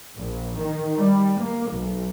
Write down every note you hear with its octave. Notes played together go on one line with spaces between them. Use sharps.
A#1
D#3
G3
A#3
B1